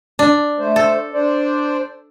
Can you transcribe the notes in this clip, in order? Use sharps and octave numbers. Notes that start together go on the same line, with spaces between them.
D4
A3 C5
A4
D4 C5 D5